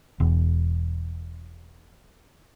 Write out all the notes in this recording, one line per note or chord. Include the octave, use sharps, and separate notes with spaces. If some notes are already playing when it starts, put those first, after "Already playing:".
E1 E2